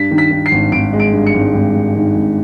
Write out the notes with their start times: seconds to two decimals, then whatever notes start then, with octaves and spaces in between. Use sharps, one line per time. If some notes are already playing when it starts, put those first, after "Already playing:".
Already playing: G2 B6
0.11 D#3
0.18 B6
0.31 D#3
0.46 C7
0.51 G#1
0.72 G#1 D7
0.93 G#3
1.00 D7
1.13 G2
1.26 C#7
1.34 G#1
1.54 G#1
1.74 G2
1.96 D#3
2.16 G#1